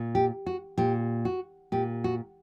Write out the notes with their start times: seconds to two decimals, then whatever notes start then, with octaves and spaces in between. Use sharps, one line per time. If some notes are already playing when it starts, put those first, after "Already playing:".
Already playing: A#2
0.15 G4
0.46 F#4
0.78 A#2 G4
1.25 F#4
1.72 A#2 G4
2.04 F#4